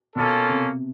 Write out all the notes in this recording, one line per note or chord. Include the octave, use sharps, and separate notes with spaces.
B2 A#3 C#4 F4 A4
C3